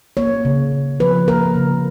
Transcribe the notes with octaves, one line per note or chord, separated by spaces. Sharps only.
A#3 C#5
C#3
C#3
F3 B4
A#3 A#4
C#3